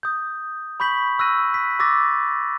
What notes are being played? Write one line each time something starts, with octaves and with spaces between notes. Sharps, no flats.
D#6 G6
B5 C#6 G6 B6 F#7
C#6 E6 F#6 A#6 D#7
B6
C#6 D6 E6 A6 A#6